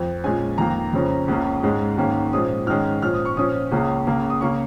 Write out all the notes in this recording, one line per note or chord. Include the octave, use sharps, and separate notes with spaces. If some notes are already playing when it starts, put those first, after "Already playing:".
Already playing: F2 F3
A#2 G#3 C#4 G#5
F2 D#3 A#3 A#5
F2 C#3 F3 C#4
C#2 C#3 A#3 C#4
G#2 G#3 C#4
G#2 D#3 A#3 C#4
A#2 F3 G#3 C#4 D#6
G#2 D#3 G#3 C#4 F6
A#2 F3 C#4 F6
D#6
C#6
A#2 F3 C#4 D#6
C#2 C#3 A#3 C#4
C#2 C#3 A#3 C#4
D#6
C#3 A#3 C#4 C#6